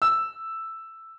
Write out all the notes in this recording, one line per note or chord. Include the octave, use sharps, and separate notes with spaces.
E6